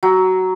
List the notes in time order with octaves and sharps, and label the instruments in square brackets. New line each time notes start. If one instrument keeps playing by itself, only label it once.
[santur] F#3